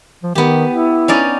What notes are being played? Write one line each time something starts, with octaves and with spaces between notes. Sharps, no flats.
F3
D#3 B3 G4
E4
C#4 D#4 D5